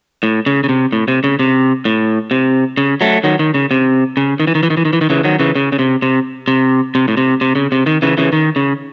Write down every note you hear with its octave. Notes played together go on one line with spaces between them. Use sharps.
A2
C#3
C#3
C3
A2
C3
C#3
C3
A2
C3
C#3
F#3 A3
D#3 F#3
D#3
C#3
C3
C#3
D#3
E3
D#3
E3
D#3
E3
D#3
E3
D#3
C#3 E3
D#3 F#3
C#3 E3
C#3
C#3
C3
C3
C3
C3
A2
C3
C3
C#3
C3
D#3
C#3 E3
C#3 E3
D#3
C#3